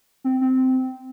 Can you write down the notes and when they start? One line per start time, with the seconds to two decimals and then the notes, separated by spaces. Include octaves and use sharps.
0.24 C4
0.41 C4